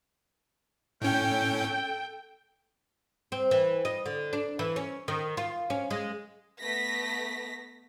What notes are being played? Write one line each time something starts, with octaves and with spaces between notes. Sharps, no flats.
A2 C#4 A4 G5
C4
E3
D#5
D3
D4
E3
C#4
D#3
F4
C#4
G#3
A3 B3 A#6 B6